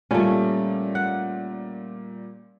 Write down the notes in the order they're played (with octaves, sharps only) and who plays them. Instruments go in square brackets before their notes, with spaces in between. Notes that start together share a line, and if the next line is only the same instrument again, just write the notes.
[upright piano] A#2 G3 F4 [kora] A3 C#4
[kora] F#5